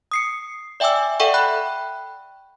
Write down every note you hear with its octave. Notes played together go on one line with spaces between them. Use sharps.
D#6 C7 C#7
D5 E5 G5 G#5 D6 E6
A4 D5 E5 F#5 G5 C#6
G5 B5 F#6